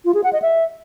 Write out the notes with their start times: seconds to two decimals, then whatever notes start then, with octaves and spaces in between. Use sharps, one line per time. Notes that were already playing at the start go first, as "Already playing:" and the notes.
0.05 F4
0.14 G#4
0.24 F#5
0.33 D#5
0.42 E5